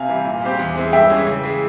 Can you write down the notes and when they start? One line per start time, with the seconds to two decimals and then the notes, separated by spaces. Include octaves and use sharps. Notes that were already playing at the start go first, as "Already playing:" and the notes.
Already playing: C3 F5 G#5
0.09 E3 G3
0.25 A#2
0.42 G3 C4 G4
0.59 E2
0.76 E3 G#3 C4
0.93 G2 E5 G5
1.10 E3 G#3 C#4
1.26 C#3
1.43 E3 G#3